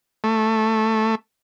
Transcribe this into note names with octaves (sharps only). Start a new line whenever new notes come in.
A3